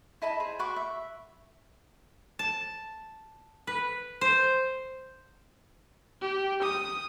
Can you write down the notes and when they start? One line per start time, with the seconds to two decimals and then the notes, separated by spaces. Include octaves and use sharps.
0.22 E4 D#5 A5 B5
0.40 G#4 C5
0.59 F#4 B5 C#6 D6
0.76 E5
2.39 A5
3.67 B4
4.21 C5
6.21 G4
6.62 D#6